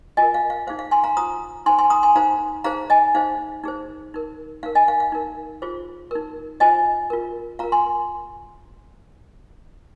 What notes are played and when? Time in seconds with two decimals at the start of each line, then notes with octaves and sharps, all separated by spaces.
0.17 F4 A#4 D#5 G#5
0.34 F5
0.50 F5
0.67 D#4 G#4 C5 F5
0.79 F5
0.91 G#5 C6
1.04 F5 A#5
1.17 F4 C5 A#5 D#6
1.66 D#4 C5 G#5 C6
1.79 G#5 C6
1.90 A#5 D#6
2.03 G#5 C6
2.16 D#4 C5 F5 A#5
2.64 D#4 G#4 C5 F5 A#5
2.90 D#5 G#5
3.15 D#4 G#4 C5 F5
3.64 D#4 G#4 C5
4.14 D#4 A#4
4.63 D#4 A#4 F5
4.75 D#5 G#5
4.88 F5
5.00 F5
5.12 D#4 A#4
5.62 F4 G#4 C5
6.11 D#4 A#4
6.60 F4 C5 D#5 G#5
7.10 F4 A#4
7.59 F4 A#4 F5 A#5
7.72 G#5 C6